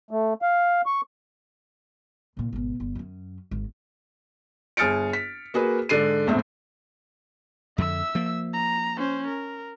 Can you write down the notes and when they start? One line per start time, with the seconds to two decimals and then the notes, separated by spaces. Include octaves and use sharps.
0.11 A3
0.42 F5
0.86 C#6
2.37 C2 A#2
2.52 G#1 B2
2.80 G1
2.95 F#2 C#4
3.51 G#1
4.77 G1 G#4 F6 A6 C#7 D7
5.13 B6
5.54 A#3 F#4 G#4 B4
5.89 G#2 D3 D5 C7 D#7
6.27 A#1 E2 A2 C4 E5
7.78 F2 D3 E5 E6
8.15 F3 A#3
8.53 A#5
8.98 C#4 C5
9.27 A#4